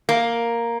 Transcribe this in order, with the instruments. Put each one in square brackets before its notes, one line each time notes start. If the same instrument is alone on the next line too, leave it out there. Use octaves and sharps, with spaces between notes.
[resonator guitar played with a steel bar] A#3